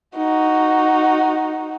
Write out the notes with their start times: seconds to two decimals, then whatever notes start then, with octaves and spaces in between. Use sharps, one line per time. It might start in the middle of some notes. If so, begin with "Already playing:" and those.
0.16 D#4 F#4